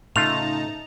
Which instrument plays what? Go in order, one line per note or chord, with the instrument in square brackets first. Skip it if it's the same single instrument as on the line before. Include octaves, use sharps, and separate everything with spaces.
[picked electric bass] A2 C#3 [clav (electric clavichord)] A3 F4 [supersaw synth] D#4 A5 A#5 [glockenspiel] F7